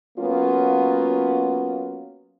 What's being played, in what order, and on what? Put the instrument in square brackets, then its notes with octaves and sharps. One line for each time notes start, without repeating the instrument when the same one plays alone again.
[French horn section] F#3 A#3 B3 C#4 F4